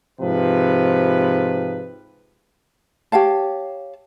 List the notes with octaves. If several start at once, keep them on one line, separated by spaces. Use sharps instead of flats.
G#2 C3 F3 B4
G4 C#5 F5 A5